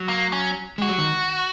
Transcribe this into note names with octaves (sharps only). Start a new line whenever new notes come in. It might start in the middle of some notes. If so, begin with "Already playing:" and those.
Already playing: F#3
A#3
C#4
G#3 F#4
F#3
D#3